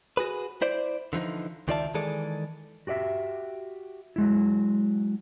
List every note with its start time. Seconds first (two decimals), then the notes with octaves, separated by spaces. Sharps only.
0.17 F#4 G#4 B4
0.62 E4 C5 D5
1.13 D3 E3 F3 D#4
1.68 C#2 D#3 F4 D5 E5 A5
1.94 D#3 E3 G#3 G#4 A4 D5
2.87 F#4 G4 D5 E5
4.16 F#3 G#3 E4